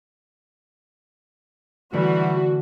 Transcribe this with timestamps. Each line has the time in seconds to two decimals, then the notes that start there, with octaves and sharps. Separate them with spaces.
1.93 D3 E3 G3 A3 F#4